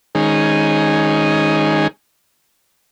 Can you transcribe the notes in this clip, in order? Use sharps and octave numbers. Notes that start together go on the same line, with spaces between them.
D#3 G#3 C#4 D#4 G#4